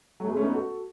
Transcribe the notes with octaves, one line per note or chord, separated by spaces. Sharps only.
F#3 A3
G#3 B3
A3 C#4
B3 D#4
F#4 A4